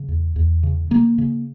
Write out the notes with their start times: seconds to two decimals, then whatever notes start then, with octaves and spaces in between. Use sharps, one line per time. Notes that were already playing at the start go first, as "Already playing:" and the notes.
Already playing: C#3
0.08 E2
0.36 E2
0.63 C#3
0.91 C#3 A#3
1.18 C#3